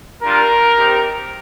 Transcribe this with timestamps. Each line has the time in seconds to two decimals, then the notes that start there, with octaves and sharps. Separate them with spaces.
0.22 G3 D4 F4 A#4
0.78 C4 D#4 G4